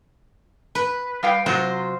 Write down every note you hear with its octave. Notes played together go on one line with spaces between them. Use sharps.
B4
G3 F5 G5
C3 F#3 F4 C5